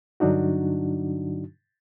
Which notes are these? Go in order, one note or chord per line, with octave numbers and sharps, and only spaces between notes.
G2 D3 F#3 D4 D#4 F#4